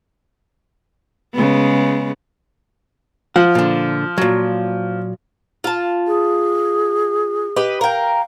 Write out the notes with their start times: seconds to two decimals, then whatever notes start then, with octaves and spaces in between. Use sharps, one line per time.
1.34 C#3 G#3 B3
3.36 F3 F#5
3.55 A#2 D3
4.18 A#2 F#3
5.64 F4 A5
6.07 G#4
7.56 G4 B4 D#5
7.81 A#4 F5 G5